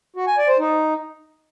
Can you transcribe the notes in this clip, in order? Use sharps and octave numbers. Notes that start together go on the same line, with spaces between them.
F#4
G#5
D5
C5
D#4